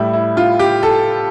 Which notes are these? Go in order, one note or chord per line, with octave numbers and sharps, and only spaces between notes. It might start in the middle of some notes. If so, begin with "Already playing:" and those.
Already playing: A2 G3 E4
E4
F4
G4
A4